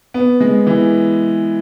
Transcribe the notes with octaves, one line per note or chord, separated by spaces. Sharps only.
B3
G#3
E3